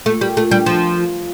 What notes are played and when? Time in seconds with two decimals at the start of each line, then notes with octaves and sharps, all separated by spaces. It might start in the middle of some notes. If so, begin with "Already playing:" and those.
0.06 A3 F4
0.21 G3 A#4
0.37 A3 F4
0.51 G3 D4
0.66 F3 A#4
0.82 F5
0.97 F4
1.12 F5